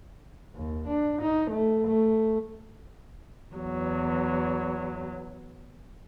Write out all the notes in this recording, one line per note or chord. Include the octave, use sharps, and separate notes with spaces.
D#2
D4
D#4
A3
A3
E2 F#3